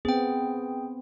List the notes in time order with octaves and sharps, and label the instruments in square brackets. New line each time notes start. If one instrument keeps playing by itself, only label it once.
[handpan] B3 C4 [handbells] G#4 G5